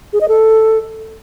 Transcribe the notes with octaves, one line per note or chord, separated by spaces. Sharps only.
G#4
D#5
A4